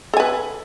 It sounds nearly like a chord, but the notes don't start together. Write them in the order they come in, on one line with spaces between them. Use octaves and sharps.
A4 G#5 B4